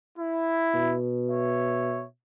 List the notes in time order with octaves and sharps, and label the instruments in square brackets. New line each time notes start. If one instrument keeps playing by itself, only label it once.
[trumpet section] E4
[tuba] B2
[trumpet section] C#5 E5